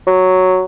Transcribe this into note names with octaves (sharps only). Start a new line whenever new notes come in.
F#3